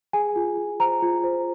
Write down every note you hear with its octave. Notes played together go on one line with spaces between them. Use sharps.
G#4 G#5
F4
F4
C5 A#5
F4
C5